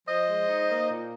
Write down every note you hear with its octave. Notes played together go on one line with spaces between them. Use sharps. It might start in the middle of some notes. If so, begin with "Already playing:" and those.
F3 C5 D#5
G#3
D#4
A#3
A#2